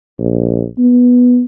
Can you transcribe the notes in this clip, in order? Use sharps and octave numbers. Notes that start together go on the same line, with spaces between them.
A#1
B3